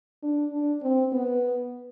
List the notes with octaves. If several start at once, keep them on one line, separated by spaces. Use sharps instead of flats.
D4
D4
C4
B3